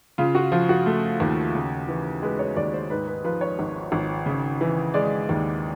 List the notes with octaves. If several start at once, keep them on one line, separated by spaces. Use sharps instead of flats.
C#3 F4
F#4
F3 F4
F#4
A3
D#2
C#3
E3
G#3 B4
C#5
D#2 D5
C5
G#2 B4
B4
F3 B4
C#5
G#1
G#1
C#3
E3
G#3 D5
D#2